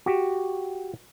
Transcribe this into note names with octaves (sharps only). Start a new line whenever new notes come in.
F#4 G4